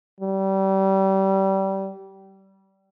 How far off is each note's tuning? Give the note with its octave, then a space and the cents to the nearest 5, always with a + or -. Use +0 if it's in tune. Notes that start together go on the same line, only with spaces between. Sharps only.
G3 -25